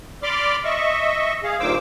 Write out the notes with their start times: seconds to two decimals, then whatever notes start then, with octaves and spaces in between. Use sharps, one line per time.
0.23 D5 B5 C6 D6 F6
0.64 D#5 E5 C#6
1.43 G#4 F5
1.60 G2 A#2 D#3 C5 D6 E6